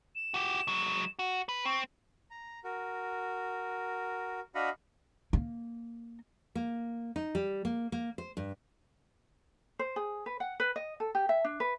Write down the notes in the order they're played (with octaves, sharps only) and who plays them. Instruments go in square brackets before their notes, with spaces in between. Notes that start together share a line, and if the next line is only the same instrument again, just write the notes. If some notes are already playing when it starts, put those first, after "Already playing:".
[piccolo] E7
[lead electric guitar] F#4 G4
F#3 G#3
F#4
B4
[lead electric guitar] C4 [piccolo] C#6
[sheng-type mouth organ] A#5
F#4 A#4
D4 F#4 D#5 F5 F#5 B5
[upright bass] A#3
[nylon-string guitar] A#3
D#4
G3
A#3
A#3
C5
G2
[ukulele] C5
G#4
B4
F#5
B4
D#5
A4
G4
E5
D4
B4